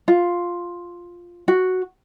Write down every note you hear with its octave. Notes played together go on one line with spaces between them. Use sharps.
F4
F#4